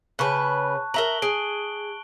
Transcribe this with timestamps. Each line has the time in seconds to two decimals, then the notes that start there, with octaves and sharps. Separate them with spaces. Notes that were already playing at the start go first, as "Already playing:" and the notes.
0.19 C#3 B4 A5 C#6 F#6
0.94 A#4 E5 A#5 F#7 G7
1.22 G#4 D7